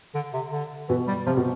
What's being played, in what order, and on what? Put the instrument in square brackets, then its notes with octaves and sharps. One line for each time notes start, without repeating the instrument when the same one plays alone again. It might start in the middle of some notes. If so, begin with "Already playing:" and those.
[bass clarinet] D3
C3
D3
[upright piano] B2 [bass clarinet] E3
[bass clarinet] G3
[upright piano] C3 [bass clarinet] F3
[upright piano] B2